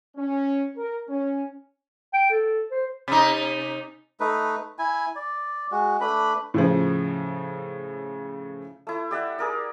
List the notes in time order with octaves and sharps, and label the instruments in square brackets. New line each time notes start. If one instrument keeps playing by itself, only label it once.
[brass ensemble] C#4
A#4
C#4
[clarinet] G5
A4
C5
[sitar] C3 D#4
[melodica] A3 D#4 B4
E4 G#5
D5
G#3 F#4
A3 D4 B4 B5
[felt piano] A2 C#3 F3
[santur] A3 E4
G4 D5 E5 F#5
G#4 A#4 D5